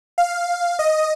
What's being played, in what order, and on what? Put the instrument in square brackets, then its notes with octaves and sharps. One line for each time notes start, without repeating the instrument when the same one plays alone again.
[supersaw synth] F5
D#5